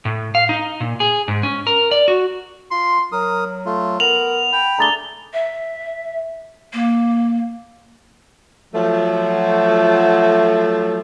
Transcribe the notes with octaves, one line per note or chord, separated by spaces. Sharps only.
A2
F5
D#4
A#2
G#4
G#2
C#4
A#4
D5
F#4
F4 C6
F#3 A#4 D#6
A3 F4
B3 A#4 F7 F#7
G5 B5
A3 D4 G#4 A#5 A6 G7
E5
A#3
F3 F#3 A3